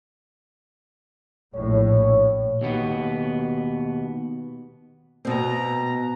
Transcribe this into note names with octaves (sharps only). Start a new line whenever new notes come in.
A#1 A2 C#5
D#2 B2 B3
B2 B3 C4 A#5